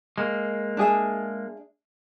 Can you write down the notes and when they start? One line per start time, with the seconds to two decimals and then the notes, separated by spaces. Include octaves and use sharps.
0.18 G#3 A#3
0.77 D4 G#4 E5